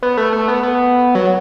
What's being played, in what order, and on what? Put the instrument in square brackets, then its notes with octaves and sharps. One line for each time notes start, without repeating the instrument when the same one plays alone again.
[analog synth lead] B3
A3
A3
B3
B3
F#3